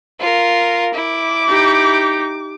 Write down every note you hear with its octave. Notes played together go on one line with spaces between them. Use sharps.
F4 A#4
E4 D6
D#4 G4